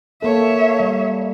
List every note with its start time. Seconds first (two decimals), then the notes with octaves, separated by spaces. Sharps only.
0.22 A#3 A4 C#5 E5
0.80 G3